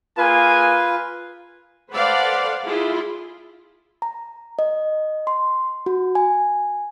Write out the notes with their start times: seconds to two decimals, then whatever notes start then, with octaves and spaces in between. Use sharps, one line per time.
0.18 A#3 F4 G#4 B4 G#5
1.92 A4 B4 C5 D5 F5 F#5
2.65 E4 F4 G#4
4.02 A#5
4.59 D#5
5.27 C6
5.86 F#4
6.15 G#5